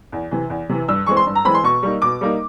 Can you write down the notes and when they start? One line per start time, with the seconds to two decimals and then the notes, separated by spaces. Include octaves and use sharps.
0.12 E2
0.31 C3 E3
0.50 E2
0.69 C3 E3
0.89 G2 E6
1.06 E3 G#3 C4 C#6
1.17 C6
1.27 G2
1.35 A#5
1.45 E3 G#3 C4 B5
1.54 C6
1.63 B2 C#6
1.83 G3 A#3 D#4
2.02 B2 D6
2.21 G3 A#3 D#4